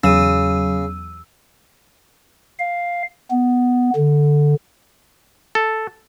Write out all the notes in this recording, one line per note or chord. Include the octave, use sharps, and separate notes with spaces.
E2 C#3 F#3 E6 D#7
F5
B3
D3
A4